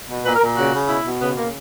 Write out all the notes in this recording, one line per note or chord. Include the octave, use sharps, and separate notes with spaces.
B2
A#2 B4
A#4
A#2
C#3 F#4
C#3
B2 E4
B2
C#3 B3
C#3 A#3